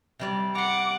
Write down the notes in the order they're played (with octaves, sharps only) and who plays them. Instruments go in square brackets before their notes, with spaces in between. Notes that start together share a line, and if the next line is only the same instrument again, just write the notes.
[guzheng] C3 G3 D5
[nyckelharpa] F#5 [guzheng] A#5 C6 [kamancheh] D6